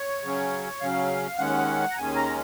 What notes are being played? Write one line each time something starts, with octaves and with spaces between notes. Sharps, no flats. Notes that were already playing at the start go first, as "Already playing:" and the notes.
Already playing: C#5
C#3 F#3 C#4
C#3 F#3 C#4 F5
D#2 D#3 G#3 C#4 F#5
A#5
D#2 D#3 G#3 C#4 G#5
A#5